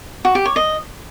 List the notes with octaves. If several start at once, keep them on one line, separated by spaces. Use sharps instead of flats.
F#4
G4
C#5
D#5